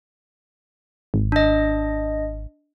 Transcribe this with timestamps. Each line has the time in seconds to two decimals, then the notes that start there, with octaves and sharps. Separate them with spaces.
1.14 G#1
1.32 D4 D#5